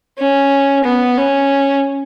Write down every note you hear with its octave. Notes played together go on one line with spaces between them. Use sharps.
C#4
B3
C#4